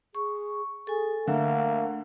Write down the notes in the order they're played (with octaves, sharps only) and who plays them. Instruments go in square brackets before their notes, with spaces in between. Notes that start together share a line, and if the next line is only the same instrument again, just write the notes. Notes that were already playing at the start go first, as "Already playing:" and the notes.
[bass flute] G#4 [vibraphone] C#6
[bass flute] G#4 [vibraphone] A4 G#5
[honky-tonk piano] D3 [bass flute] A3 [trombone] A#3 [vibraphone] E5